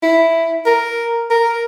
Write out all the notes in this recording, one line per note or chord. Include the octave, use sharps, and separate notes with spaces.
E4
A#4
A#4